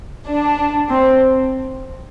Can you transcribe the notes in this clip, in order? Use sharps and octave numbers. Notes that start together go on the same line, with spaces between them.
D4
C4